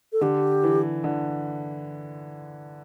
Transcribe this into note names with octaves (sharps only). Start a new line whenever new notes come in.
A4
D3 G4
E3
D3